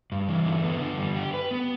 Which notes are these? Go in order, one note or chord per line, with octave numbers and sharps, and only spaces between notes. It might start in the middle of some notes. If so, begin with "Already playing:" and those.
G2
E3
D3
B3
D3
G3
G4
B4
B3